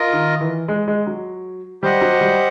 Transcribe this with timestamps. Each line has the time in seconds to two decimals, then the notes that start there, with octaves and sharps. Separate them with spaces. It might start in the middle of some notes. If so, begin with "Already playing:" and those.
Already playing: F4 A#4 D#5
0.13 D#3
0.41 E3
0.68 G#3
0.88 G#3
1.07 F#3
1.82 G3 G4 C5 D#5 F#5
2.01 F#3
2.21 G3